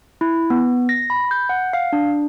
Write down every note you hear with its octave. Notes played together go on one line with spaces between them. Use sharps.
E4
B3
A#6
B5
G6
F#5
F5
D4